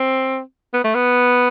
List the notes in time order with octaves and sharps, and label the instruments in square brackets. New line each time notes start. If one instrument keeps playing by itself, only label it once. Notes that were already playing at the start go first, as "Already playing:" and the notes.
Already playing: [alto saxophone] C4
B3
A3
B3